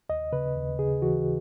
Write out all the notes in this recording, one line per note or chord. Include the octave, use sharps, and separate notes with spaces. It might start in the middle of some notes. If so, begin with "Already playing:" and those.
D#2 D#5
C#3 B4
D#2
C#3 G#4
E3 F#4